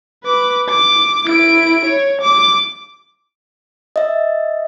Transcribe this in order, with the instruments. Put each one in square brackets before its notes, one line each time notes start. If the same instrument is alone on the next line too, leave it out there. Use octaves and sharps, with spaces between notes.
[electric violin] B4 D6
D6
E4 D7
C#5
D6
[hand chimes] D#5 E5